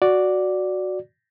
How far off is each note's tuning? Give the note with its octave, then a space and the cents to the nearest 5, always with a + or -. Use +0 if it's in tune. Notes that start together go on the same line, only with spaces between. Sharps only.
F#4 +0 D5 +0